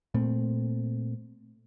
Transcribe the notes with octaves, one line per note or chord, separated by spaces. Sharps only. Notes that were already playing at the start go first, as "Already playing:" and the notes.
A#2 A3 C4